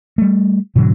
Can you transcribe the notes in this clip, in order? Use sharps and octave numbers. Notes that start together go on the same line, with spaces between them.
G3 A3
G#2 B2 D3 F#3